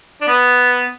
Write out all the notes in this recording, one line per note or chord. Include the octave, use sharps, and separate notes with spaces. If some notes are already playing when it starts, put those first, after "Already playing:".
D4
B3